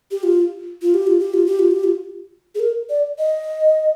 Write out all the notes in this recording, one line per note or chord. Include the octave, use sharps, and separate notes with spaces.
G4
F4
F4
G4
F4
G4
F4
G4
F4
G4
F4
G#4
A#4
D5
D#5